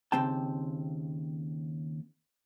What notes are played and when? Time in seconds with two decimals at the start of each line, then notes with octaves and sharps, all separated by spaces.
0.12 D#2 C#3 C4 G5 A5